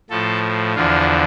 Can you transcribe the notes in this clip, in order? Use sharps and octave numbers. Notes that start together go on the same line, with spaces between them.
A2 F3 A4
E2 D3 F3 F4